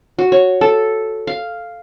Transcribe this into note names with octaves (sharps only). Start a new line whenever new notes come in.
F#4
C#5
A4
F5